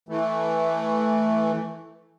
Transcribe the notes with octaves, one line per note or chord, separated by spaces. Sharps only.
E3 A3